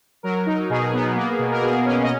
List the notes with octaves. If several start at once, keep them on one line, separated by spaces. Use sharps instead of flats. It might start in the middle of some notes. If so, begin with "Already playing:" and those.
F#3 A#4
D#4
B2 G#4
B3
A#3
B2
A#4
B2 G#4
C#4
D#5